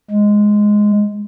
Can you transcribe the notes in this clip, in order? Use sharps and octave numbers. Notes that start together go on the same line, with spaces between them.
G#3